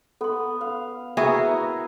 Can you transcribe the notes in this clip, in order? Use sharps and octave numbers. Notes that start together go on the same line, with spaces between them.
B3 A4 C6
F5
B3 E4 F#4 G#4 A#4 E5